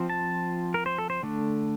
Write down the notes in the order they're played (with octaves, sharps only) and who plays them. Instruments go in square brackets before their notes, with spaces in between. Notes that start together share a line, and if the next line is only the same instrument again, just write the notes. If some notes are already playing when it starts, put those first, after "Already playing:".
Already playing: [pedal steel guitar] F3 C4 F4
A5
A#4
C5
A4
C5
D3 A3 D4